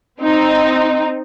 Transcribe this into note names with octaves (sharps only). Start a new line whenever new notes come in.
C4 D#4